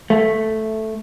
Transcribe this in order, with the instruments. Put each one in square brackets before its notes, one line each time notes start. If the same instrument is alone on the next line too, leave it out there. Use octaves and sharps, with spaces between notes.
[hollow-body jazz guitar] A3